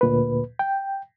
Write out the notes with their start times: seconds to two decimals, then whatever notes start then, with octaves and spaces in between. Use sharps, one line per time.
0.01 D2 A#2 B4
0.59 G5